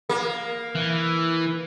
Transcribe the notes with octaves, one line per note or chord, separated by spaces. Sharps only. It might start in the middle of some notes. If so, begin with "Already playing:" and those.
A#3
E3